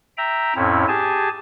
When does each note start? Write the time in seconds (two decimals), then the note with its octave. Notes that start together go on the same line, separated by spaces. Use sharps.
0.17 E5 G5 A#5
0.56 F2 A2 C4 C#4 E4
0.88 G4 G#4 G#5 A5